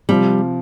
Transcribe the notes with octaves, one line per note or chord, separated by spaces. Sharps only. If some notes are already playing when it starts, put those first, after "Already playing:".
C3 F3 G3